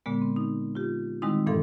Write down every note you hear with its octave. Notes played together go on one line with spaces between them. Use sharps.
A#2 D3 G#3 B3
C4
D#4
F4 G4
D#3 G3 G#3 C4 D#4 E4
G2 A#2 E3 A4 F5 C6